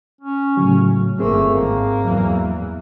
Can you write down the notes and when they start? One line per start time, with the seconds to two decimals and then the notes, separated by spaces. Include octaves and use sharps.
0.21 C#4
0.57 A2 C#3 F#3
1.19 G1 A3 A#3 C4 G#4 C5
1.55 G#1 A#3
2.04 E2 F#3